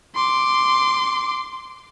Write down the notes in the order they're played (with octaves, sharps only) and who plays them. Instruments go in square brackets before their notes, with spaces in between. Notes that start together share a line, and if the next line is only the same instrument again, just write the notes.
[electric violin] C6 D6